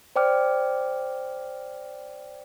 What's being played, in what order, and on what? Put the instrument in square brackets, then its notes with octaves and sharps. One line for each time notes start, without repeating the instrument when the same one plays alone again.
[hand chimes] C5 D5 G5 D6 F6